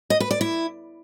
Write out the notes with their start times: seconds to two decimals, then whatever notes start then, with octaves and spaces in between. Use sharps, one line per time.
0.10 D#5
0.20 B4
0.31 D5
0.41 E4